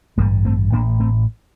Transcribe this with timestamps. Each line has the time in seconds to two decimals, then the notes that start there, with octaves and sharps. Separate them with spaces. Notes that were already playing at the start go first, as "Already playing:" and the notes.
0.17 A1 G2 D3 G3 A#3
0.45 A3 C4
0.72 A1 A2 A#3 D4
1.00 A3 C4